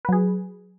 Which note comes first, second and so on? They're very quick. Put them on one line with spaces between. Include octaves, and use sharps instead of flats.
B4 F#3 G#4